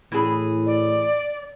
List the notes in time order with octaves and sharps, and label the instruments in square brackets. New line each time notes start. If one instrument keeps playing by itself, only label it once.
[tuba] A2 [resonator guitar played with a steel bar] E3 G#4
[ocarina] D5